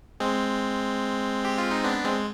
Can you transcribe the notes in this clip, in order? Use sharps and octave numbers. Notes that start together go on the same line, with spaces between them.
G#3 C4
G4
F4
D#4
B3 D4
G#3 C4